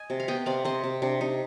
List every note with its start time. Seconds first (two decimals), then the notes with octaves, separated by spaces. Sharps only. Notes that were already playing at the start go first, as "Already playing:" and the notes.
Already playing: D#5 G#5
0.10 C3
0.20 F5
0.28 B3 D#5 G5
0.46 C3 D5 F5
0.65 C3 C5 D#5
0.84 C3
1.02 C3 D4
1.21 C3 D#4